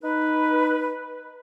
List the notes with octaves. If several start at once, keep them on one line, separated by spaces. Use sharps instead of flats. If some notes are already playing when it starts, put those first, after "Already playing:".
D#4 B4